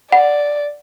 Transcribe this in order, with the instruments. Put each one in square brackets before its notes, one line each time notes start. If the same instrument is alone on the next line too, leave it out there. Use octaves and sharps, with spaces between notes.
[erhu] D5 [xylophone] F#5